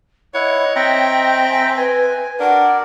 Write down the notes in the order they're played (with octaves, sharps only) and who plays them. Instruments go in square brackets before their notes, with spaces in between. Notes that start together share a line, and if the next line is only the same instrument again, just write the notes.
[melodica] E4 F#5 [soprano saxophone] C#5 [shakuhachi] D#5
[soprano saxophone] C4 [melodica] E5 G5 A#5
[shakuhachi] G#5
[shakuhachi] B4 [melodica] G#5
[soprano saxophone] D4 [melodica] A#4 D5 [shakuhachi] F#5